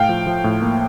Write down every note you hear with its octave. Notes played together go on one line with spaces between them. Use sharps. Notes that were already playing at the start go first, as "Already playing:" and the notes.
Already playing: A2 F5 G5
F3
F3
A2
A#3